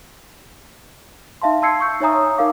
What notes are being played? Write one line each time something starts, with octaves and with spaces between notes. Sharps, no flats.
D#4 E5 F5 A5 C6
A5 C6 E6 G#6 C7 C#7
C#6 E6 G6
D#4 C#5 E5 G#5 A#5 D#6
D#4 A#4 F5 D6